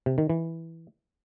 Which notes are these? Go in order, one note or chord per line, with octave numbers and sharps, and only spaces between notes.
C3
D#3
E3